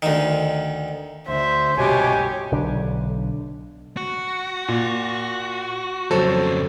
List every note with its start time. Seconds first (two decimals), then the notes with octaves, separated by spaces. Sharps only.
0.02 D2 D#3
1.28 D2 D3 C5 E5
1.77 G1 C2 B2 G4 C#5 G#5
2.52 B1 D3 D4
3.97 F#4
4.68 A#2
6.11 F2 C#3 F#3 A4 C5